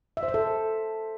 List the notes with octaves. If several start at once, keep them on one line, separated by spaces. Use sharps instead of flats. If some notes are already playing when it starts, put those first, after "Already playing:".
E5
C5
E5
A4